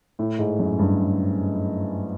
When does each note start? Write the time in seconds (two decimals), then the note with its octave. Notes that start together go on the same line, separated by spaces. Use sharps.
0.19 A2
0.39 G#2
0.59 F#2
0.79 G2